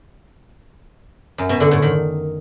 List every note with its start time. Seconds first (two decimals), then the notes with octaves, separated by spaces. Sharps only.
1.38 F#2
1.49 B2
1.60 D3
1.71 A2
1.82 D#3